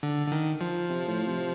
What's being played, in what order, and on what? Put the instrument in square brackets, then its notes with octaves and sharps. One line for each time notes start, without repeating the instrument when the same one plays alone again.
[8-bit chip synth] D3
D3
D#3
F3
[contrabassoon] C3
A2
C3